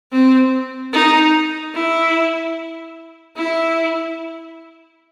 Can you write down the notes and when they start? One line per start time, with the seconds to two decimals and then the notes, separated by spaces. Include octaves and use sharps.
0.12 C4
0.93 D#4
1.75 E4
3.37 E4